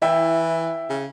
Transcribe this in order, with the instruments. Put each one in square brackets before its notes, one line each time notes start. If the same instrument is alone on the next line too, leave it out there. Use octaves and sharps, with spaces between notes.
[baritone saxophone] E3 [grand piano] E4 E5 G5
[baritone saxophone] C#3